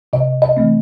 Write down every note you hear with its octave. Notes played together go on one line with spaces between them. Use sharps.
C3 D#5
D#5
E3 A3 C4